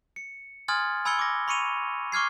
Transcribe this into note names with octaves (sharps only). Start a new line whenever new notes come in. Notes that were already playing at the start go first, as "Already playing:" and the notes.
C#7
G#5 C6 D#6 F6 G#6 A6
G#5 B5 E6 G#6 C#7 G7
D6 A#6
B5 C#6 C#7 D#7 F7
C#6 D6 F6 G#6 C7